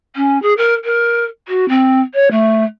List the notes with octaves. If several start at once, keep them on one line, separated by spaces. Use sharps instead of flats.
C#4
G#4
A#4
A#4
F#4
C4
C#5
A3